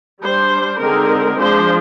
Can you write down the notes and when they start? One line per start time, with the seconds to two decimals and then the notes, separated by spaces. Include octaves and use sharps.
0.21 G3 D4 C5
0.80 D3 G#3 C4 D#4 A#4
1.39 F3 G#3 D4 C5